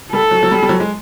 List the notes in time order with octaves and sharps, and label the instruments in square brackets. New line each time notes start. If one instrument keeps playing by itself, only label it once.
[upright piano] G3 [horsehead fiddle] A4
[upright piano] F#3
F#3
G3
G3
F#3
G#3